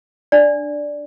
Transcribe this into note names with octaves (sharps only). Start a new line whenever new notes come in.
D4 D5